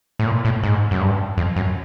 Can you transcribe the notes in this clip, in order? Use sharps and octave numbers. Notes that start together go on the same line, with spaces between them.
A2
A#2
A2
G#2
F#2
G2
F2
F#2